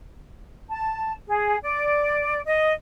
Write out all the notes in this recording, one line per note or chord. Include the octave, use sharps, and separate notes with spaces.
A5
G#4
D5
D#5